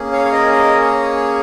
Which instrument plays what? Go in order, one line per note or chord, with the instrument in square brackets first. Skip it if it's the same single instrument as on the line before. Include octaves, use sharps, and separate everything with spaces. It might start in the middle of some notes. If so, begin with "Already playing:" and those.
Already playing: [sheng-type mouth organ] A#3 C#4 G#4
C#5 F5
C#5
A#4 D#5
A#4 D#5
C#5